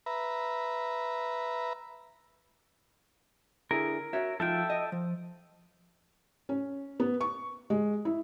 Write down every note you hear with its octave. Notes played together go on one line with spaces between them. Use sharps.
B4 E5 A#5
D3 E4 G#4 A#4
F#4 C#5 E5
F3 D#4 F4 A4 E5 G5
D#5
F3
C#4
B3
C#6
G#3
E4